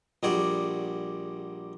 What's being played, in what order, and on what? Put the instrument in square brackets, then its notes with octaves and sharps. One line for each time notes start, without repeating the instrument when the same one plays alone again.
[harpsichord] A#1 G3 F#4 G#4 D5